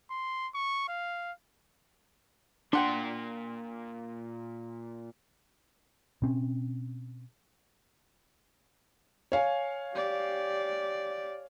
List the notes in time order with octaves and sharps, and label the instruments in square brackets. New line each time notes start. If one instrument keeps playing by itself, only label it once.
[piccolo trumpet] C6
C#6
F5
[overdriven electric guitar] A#2 C6 [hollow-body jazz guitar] D4 F#5 G5
[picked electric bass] B2 C4 C#4
[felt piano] C#5 F5 G#5
[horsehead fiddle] G4 D5